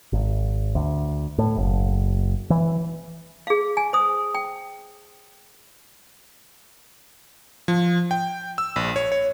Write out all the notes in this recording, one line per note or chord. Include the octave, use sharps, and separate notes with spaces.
G#1
D2
A2
F#1
E3
G#4 F5
G#5
C5 D#6
G5
F3
G5
E6
A#1
C#5
C#5